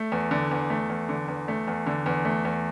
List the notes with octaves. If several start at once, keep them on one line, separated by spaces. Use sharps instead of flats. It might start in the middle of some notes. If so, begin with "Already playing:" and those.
Already playing: A3
E2
D3
E2
A3
E2
D3
E2
A3
E2
D3
E2
A3
E2